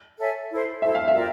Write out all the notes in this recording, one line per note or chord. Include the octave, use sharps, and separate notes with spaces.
A4 C#5 E5 G#5
E4 A4 C5
E4 A4 C5 E5
F5
E5
F4 A#4 D5 G5